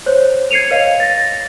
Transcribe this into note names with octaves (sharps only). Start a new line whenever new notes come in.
C5 C#5
G#6 C7 C#7 D#7 F7
B4 C#5 D#5 F5
A6 A#6